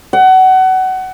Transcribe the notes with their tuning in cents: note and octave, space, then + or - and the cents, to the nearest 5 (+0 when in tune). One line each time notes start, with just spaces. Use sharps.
F#5 +25